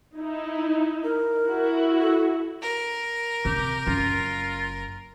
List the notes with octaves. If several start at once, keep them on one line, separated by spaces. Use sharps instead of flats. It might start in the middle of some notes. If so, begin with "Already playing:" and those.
D#4 E4
A#4
E4 F#4
A4
A#4
C3 G4
F#1 F4